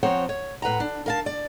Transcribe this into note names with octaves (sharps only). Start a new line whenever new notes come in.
F3 C4 C5 C#5 F#5 A#5
C#5
A2 B4 F#5 A#5
D4
A#4 F5 A5
D5